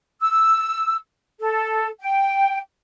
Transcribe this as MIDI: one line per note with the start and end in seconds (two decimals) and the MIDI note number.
0.21 0.97 88
1.40 1.89 69
2.01 2.60 79